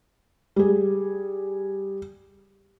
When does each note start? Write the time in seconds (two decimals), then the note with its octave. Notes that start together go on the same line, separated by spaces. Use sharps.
0.56 G3 G#4